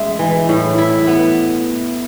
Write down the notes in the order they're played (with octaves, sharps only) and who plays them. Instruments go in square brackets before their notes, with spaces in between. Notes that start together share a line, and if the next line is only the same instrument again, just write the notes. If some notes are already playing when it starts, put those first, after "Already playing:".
Already playing: [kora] G#3 [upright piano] E5
[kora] E3
A2
E4
B3